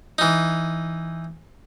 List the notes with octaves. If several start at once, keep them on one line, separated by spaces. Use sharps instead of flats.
E3 D#4